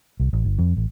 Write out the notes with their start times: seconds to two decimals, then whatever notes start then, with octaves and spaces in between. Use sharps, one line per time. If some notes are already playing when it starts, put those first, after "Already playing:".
0.20 C2
0.33 A1
0.45 G1
0.59 F2
0.77 A1